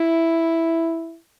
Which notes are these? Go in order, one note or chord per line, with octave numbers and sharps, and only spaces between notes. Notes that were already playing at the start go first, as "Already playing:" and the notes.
Already playing: E4